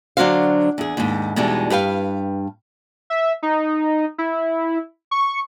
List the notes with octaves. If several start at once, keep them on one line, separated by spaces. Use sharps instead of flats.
D3 F#3 D4 F#4 C5 F5
E2 G#4
D#2 G#2
E2 B2 G3 G#3 D4 D#4
G2 G4 B4 F5
E5
D#4
E4
C#6